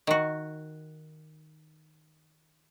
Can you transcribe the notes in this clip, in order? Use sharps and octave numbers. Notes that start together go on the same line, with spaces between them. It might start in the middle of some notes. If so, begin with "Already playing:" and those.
D#3 F#4